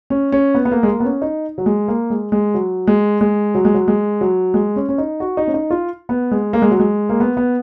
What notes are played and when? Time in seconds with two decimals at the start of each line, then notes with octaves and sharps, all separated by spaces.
0.10 C#4
0.32 C#4
0.55 B3
0.65 B3
0.71 A#3
0.83 G#3
0.88 A#3
1.00 B3
1.05 C#4
1.22 D#4
1.58 F#3
1.66 G#3
1.88 A#3
2.10 G#3
2.32 G#3
2.54 F#3
2.87 G#3
3.21 G#3
3.55 F#3
3.65 G#3
3.74 F#3
3.88 G#3
4.21 F#3
4.54 G#3
4.76 C#4
4.89 C#4
4.98 D#4
5.20 F#4
5.37 D#4
5.47 C#4
5.54 D#4
5.70 F4
6.09 B3
6.31 G#3
6.53 A#3
6.62 G#3
6.71 F#3
6.79 G#3
7.09 A#3
7.20 B3
7.37 B3